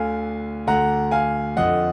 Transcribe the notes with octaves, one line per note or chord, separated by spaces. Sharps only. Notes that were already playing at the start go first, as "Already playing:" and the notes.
Already playing: D2 D3 F5 G#5
D2 D3 F#5 A#5
F5 G#5
F2 D3 D#5 F#5